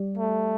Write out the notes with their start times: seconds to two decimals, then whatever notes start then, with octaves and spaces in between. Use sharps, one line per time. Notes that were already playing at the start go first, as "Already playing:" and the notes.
Already playing: G3
0.18 A3